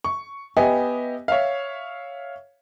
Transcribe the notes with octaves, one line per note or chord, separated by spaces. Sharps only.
C#6
B3 G4 D#5 E5 G#5
C#5 E5 F5